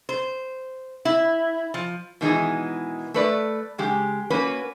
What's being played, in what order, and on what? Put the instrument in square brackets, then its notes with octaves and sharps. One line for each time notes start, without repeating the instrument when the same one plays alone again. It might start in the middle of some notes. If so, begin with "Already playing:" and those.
[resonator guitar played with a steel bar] C5
E4
F3
B2 D#3 E3 G#3 D#4 G#4
A3 B4 D5
C#3 G#3 G4
A#3 C#4 F#4 B4